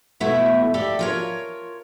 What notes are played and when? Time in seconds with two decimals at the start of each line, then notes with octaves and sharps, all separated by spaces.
0.20 B2 A3 E4 E5 F#5
0.74 G4 A4 D5 E5
0.99 F4 A#4 C#5